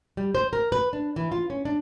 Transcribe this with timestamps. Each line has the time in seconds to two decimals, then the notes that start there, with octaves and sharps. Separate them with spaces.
0.17 G3
0.35 C5
0.53 A#4
0.72 B4
0.93 D4
1.16 E3
1.32 F4
1.50 C#4
1.65 D4